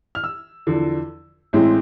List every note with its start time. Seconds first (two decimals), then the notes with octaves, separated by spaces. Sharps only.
0.15 F6
0.24 E6
0.67 E2 D3 F3
1.53 A1 A2 G#3 C4 E4